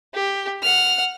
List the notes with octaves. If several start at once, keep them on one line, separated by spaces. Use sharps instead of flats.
G4
F#5 F6